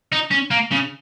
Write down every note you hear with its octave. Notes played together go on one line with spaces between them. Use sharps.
D#4
C#4
A#3
C#3